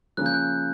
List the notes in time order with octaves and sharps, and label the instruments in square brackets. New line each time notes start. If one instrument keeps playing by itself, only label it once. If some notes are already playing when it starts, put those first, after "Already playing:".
[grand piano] C#3 F3 A#3 C#4 [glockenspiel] F#6
[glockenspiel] G6
F#6